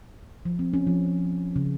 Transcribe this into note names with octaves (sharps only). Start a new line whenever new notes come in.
F3
C4
C#4
F3
C#3